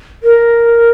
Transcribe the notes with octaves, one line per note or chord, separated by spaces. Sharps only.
A#4